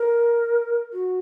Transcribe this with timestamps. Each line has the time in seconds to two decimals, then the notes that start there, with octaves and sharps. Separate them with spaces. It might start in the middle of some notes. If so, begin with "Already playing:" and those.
Already playing: A#4
0.93 F#4